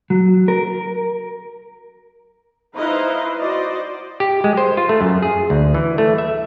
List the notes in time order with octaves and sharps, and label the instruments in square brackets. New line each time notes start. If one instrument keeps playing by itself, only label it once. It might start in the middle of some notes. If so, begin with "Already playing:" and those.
[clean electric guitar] F#3
A#4
[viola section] D#4 E4 B4 C5 D#5 F5
F#4 C5 D5 D#5
[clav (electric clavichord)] G4
G#3
C5
F4
A3
F#2
G#4
D2
E3
A3
E5